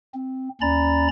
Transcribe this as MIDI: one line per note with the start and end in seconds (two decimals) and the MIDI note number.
0.14 0.49 60
0.61 1.08 39
0.61 1.08 61
0.61 1.08 74
0.61 1.08 82
0.61 1.08 83
0.61 1.08 93